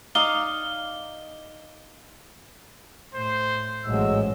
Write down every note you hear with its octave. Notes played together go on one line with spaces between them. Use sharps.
D#4 D5 F5 G7
A2 C5
A1 G#2 F#3 G#3 E6